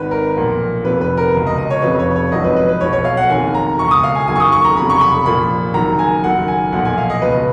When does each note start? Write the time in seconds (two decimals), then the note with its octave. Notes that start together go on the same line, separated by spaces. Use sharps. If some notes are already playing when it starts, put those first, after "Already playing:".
Already playing: G#1 G#2 D#3 B4
0.11 A#4
0.36 B1 A#2 F3
0.85 F1 F2 F3 B4
1.01 B4
1.17 A#4
1.34 C#2 B2
1.47 D#5
1.58 D#5
1.70 C#5
1.82 F1 F2 C#3 F3 B4
1.99 C#5
2.15 C#5
2.32 G#1 F#2 F3 D#5
2.44 B4
2.56 B4
2.68 B4
2.80 B1 B2 C#5
2.93 C#5
3.05 F5
3.17 F#5
3.30 F#1 F2 D#3 G#5
3.54 A#5
3.78 C#2 B2 C#6
3.91 D#6
4.03 F5
4.15 G#5
4.28 F#1 F#2 D#3 G#5
4.36 C#6
4.40 D#6
4.52 C#6
4.64 A#5
4.77 F1 F2 C#3 B5
4.90 C#6
5.01 B5
5.25 A#1 A#2 F3 B5
5.74 F#1 F#2 D#3 A#5
5.99 G#5
6.23 F#1 F#2 D#3 F#5
6.48 G#5
6.72 B1 A#2 F3 F#5
6.85 G#5
6.98 F5
7.10 D#5
7.22 C#2 B2 B4